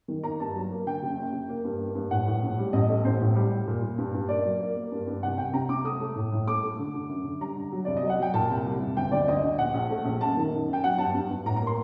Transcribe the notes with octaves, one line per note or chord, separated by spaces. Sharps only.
D#3
A#3 A#5
G2 A5
F#3
A#3
D3 G5
F#1
F#2
F#1
A#3
G2
A#3
G2
A2 F#5
A2
A#1
G3
A1 D#5
A3
A1 C5
A2
G3
G3
A#2
A#2
G2
G2
A#3 D5
F#3
A#3
A#3
G2
G2
C2 F#5
C2 G5
C3 A#5
C3 D6
A3 D#6
A3
A2
A2
A3 D6
A3
D3
D3
F#2
D3
G3 A#5
D3
F#3
C2 D5
D#5
F#3
F#5
F#3 G5
A#2 A5
C2
G3
C2
D2 G5
D2 D5
D2 D#5
D3
A#1 F#5
A#1
A3
A#1
F#2 A5
D#3
F#2
F#2
G5
F#3 F#5
G2 A5
G2
G2
A2 A#5
A#3 A#5
C6